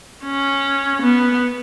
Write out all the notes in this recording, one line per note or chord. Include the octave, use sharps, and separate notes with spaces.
C#4
B3